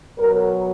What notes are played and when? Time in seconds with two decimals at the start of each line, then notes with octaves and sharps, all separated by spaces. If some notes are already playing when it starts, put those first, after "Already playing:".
0.18 B2 F#3 A#4